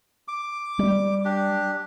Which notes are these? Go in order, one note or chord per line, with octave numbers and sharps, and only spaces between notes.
D6
G3
D4 G4